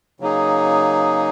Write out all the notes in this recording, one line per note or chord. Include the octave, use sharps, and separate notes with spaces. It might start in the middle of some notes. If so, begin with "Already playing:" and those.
C#3 F#3 A#3 D#4 G#4